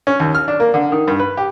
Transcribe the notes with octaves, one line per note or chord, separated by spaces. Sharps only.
C#4
D#2
F6
D4
A#3
D3
D#3
G2
B4
G4